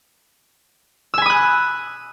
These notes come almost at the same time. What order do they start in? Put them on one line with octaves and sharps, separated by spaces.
E6 G#5 B5 D#6 F#6